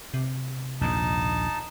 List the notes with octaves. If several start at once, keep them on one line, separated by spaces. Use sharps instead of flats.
C3
A#1 D#2 G#2 D#4 A5